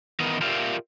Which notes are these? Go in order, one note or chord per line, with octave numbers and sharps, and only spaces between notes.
D#3 E3 B3 A#4 D#5
F4 G4 A#4 D5 E5 F5